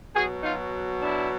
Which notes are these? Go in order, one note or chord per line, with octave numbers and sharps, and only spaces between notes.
B2 F#3 F#4 G#4
D#4 F4
D4 E4